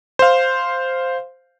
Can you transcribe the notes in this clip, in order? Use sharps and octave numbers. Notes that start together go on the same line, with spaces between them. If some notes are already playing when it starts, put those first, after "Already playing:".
C5 F5